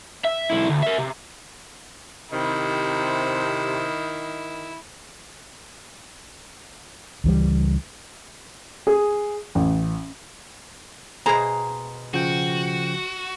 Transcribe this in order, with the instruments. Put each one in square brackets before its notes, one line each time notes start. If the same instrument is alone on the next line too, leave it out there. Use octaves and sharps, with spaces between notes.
[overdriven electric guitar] E5
B1 E4
D2
A#4 E5
C3
[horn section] C3 [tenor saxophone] D#3 [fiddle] E4
[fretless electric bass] C#2 E3 G3
[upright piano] G#4
A1
[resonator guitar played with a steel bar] B2 A#5 [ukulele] G#4 C5
[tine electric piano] C#3 F3 G5 [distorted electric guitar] F#4